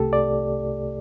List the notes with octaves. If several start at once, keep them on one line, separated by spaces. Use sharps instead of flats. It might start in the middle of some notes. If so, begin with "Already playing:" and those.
Already playing: C2 C3 A3 G4 A4
D5